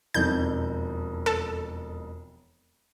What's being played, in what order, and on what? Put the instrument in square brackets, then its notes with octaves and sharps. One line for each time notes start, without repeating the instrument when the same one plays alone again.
[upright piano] E1 F2 D#4 [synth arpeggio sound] G6
[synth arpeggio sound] A4